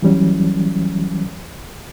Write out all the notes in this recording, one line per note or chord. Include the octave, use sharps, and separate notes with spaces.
E3 F#3 G3 C#4